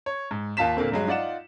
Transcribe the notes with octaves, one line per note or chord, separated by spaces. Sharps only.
C#5
G#2
D#2 F4 F5 A5 B6 E7
A#2 D3 A#3 C4
G2 F#3 G#3
D#4 F4 D5 F#5 E7